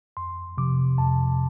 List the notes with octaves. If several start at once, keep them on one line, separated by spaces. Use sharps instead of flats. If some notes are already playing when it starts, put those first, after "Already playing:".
F2 C6
C3 F3 D6
F2 A5